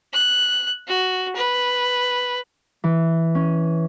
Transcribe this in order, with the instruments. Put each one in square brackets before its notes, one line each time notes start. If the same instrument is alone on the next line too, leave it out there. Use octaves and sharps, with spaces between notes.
[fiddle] F#6
F#4
B4
[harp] E3
C#4